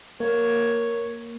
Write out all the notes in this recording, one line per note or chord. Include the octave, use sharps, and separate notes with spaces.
A#3 A#4 C#5